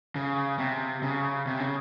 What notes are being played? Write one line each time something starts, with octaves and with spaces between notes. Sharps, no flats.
C#3
C3
C#3
C3
C#3